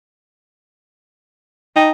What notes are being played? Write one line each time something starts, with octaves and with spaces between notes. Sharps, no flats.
D#4 G5 A5